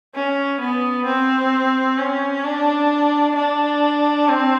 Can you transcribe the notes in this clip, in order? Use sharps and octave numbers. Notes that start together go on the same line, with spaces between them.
C#4
B3
C4
C#4
D4
D4
C4